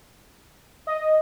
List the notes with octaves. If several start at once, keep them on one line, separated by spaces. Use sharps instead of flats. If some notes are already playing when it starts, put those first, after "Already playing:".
D#5